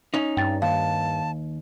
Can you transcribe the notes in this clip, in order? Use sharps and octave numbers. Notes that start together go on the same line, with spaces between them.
C#4 D#4
G2 G5 A6
D#2 F5 A5